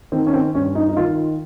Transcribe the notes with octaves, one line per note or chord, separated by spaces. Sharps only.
D#3 C4
C#4
C4
G2 C#4
D#4
D#4
D#3 F4